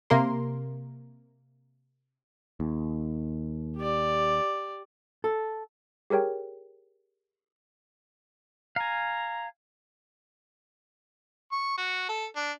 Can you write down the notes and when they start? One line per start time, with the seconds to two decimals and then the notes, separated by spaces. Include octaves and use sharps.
0.10 C3 A#3 A#4 C6
2.60 D#2
3.77 G4 D5
5.24 A4
6.10 G4 G#4 A#4 C#5 G5
8.76 F5 G#5 A#5
11.52 C#6
11.78 F#4
12.09 A4
12.36 D4